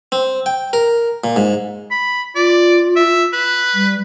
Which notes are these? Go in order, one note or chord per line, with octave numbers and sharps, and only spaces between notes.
C4
G5
A#4
A#2
G#2
B5
F4 D5
E5
B4
G3